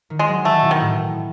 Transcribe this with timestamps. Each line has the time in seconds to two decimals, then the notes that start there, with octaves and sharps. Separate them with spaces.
0.10 D#3
0.19 G#3
0.28 F#3
0.45 E3 A3
0.62 B2
0.71 D#3
0.80 A2